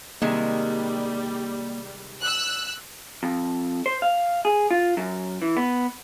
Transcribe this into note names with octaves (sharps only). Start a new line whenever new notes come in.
C3 D#3 G3 G#3 A#3
E6 F#6
F2
C5
F5
G#4
F4
F#2
E3
B3